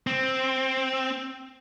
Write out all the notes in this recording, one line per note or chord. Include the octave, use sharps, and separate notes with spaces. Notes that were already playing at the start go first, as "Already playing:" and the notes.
C4